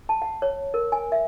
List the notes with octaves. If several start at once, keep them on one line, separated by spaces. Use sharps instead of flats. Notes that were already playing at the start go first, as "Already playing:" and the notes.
A5
F#5
C#5
A#4
G#5
E5